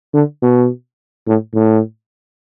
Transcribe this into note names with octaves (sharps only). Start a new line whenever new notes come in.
D3
B2
A2
A2